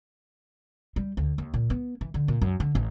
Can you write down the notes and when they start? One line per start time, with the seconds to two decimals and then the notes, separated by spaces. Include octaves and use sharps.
0.96 G3
1.17 D2
1.38 D#2
1.54 A#2
1.70 B3
2.01 E3
2.14 D3
2.28 A#2
2.42 F#2
2.60 D3
2.75 A1